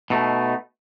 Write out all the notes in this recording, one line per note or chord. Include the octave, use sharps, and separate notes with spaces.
B2 A3 D#4